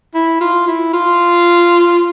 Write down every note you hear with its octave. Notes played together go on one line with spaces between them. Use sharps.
E4
F4
E4
F4